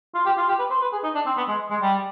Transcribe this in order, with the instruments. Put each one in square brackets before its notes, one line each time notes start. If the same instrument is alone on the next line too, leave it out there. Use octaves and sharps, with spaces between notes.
[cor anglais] F4
G4
F4
G4
B4
C5
B4
G#4
D#4
D4
C4
B3
G#3
G#3
G3